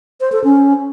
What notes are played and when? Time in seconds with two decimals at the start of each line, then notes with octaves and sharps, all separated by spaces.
0.21 C5
0.32 A4
0.44 C#4